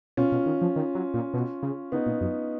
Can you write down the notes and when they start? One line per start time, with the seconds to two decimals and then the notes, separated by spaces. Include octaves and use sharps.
0.17 B2 C#4 F4
0.32 B2
0.46 D#3
0.62 F3
0.76 D#3
0.95 F#3
1.14 A#2
1.34 B2
1.63 C#3
1.92 C#3 B3 D#4
2.06 A#2
2.21 F#2